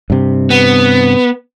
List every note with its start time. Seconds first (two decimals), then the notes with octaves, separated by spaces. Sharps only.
0.10 G2 C3
0.50 B3